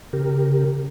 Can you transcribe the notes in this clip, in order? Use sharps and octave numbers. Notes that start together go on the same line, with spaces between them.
C#3 G4 A#4